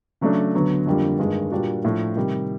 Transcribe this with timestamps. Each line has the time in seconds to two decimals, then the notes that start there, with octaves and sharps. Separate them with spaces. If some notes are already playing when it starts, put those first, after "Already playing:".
0.21 C#3 F#3 A3 D4
0.55 D2 D3 F#3 B3
0.86 F2 D3 G3 A#3
1.19 G2 D#3 G#3
1.51 A#2 G3 A#3 D4 F#4
1.85 A2 F3 A3 D4
2.16 C3 D#3 G3